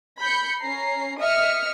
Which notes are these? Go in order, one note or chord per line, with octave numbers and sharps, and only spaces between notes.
B5 G6 C#7
C#4 A#5 C7
D#5 E5 D#6 F6 C#7